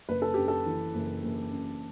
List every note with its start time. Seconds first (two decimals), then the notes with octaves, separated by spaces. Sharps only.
0.09 F#1 B4
0.22 A4
0.34 F#2 G4
0.48 A4
0.66 E3
0.95 F#1
1.23 F#1
1.52 F#2